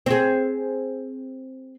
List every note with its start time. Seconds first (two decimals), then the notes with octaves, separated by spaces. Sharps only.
0.06 C4 G#4